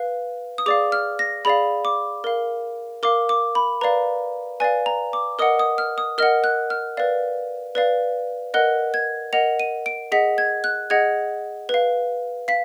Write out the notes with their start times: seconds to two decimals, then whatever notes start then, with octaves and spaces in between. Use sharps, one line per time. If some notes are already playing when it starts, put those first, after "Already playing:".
Already playing: B4 F5
0.58 D#6
0.66 G#4 D5 F5 D6
0.92 F6
1.19 A#6
1.45 G#4 D5 F5 B5
1.85 D6
2.24 A#4 F5
3.03 A#4 F5 D6
3.29 D6
3.55 B5
3.81 B4 D5 F5 A#5
4.60 B4 D5 F5 G#5
4.86 A#5
5.13 D6
5.39 A#4 D#5 F#5 D#6
5.59 D#6
5.78 F6
5.98 D#6
6.18 A#4 D#5 F#5 F6
6.44 F#6
6.70 F6
6.97 B4 D5 F5
7.75 B4 D5 F5
8.54 A#4 D#5 F#5 F#6
8.94 G#6
9.33 A#4 D#5 F#5 F7
9.60 D#7
9.86 D7
10.12 G#4 D#5 F#5 B6
10.38 G#6
10.64 F#6
10.90 G#4 D#5 F#5 G#6
11.69 B4 F5
12.48 F5 B6